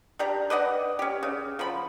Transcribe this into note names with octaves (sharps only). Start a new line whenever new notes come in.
D4 G4 A#5
B4 D5 D#5 F#5
C#4 G4
C#3
F3 F#3 B5